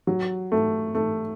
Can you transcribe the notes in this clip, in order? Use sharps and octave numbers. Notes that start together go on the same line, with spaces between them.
F#3
A3
A3